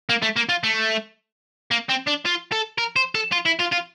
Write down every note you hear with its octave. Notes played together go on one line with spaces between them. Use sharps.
A#3
A3
A#3
F4
A3
A#3
C4
D4
F4
A4
A#4
C5
A4
F4
E4
F4
F4